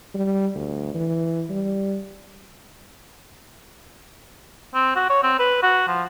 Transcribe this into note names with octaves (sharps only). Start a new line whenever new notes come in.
G3
D2
E3
G3
C4
F#4
C#5
C4
B4
F#4
F3